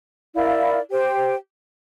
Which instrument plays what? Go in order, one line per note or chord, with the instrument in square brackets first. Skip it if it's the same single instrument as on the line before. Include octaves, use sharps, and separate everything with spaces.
[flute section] E4 A#4 D5 F5
G4 C5 G5